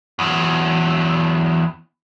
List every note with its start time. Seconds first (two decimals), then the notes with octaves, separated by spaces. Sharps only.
0.19 E2 F#3